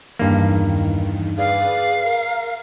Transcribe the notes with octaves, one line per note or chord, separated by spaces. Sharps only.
E2 G2 D#3 A#3
G#4 B4 D5 F5
A#4